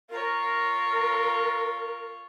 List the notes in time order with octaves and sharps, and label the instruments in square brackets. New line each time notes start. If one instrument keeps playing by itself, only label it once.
[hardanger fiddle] F4 C#5 [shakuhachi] A#4